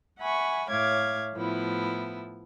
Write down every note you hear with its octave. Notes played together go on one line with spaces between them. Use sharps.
E5 F#5 G#5 B5 C#6
A2 C#5 E5 F5 D6 G#6
A2 F3 B3 E4